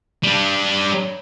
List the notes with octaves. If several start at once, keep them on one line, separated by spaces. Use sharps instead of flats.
G3 D4